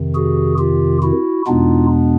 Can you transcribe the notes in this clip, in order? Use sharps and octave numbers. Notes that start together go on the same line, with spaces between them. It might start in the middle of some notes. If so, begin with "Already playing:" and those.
Already playing: F2 C3 D#3
F#4 G#4
F4 G4
E4 F#4
E2 B2 G#3 B3 D4 D#4 F4